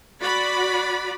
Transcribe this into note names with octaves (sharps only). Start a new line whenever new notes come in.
F#4 D5 B5